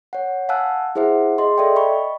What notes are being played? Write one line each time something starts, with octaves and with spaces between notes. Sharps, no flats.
C#5 F#5
F5 F#5 G#5 A5 E6 F#6
E4 G#4 C5 E5 F#5
G#4 D#5 C6
A4 D5 E5 G5
D#5 B5 C#6